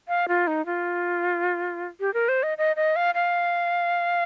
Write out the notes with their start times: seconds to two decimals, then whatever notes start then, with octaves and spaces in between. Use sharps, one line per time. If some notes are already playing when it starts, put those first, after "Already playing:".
0.08 F5
0.28 F4
0.47 D#4
0.66 F4
2.00 G4
2.14 A#4
2.29 C5
2.43 D#5
2.58 D#5
2.76 D#5
2.96 F5
3.15 F5